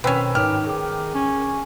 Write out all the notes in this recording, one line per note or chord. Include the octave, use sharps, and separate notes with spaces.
B2 D#3 C4 C#4 B4 E6
G#2 D#3 D#4 G4 C#5 F6
G#4 D6
C#4